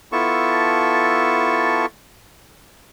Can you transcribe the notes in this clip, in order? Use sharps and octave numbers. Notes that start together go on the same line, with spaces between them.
B3 E4 F4 A4 A5 C#6